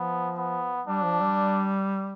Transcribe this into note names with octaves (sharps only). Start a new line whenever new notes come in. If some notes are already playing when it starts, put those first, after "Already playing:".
Already playing: F3 B3
B3
G3 D4
F3
G3